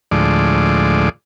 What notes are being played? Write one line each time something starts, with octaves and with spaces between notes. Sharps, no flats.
D2 A2 F3 G#3 D5